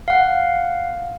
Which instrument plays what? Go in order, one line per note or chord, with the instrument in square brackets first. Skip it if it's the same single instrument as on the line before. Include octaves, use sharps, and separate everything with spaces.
[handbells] F5 F#5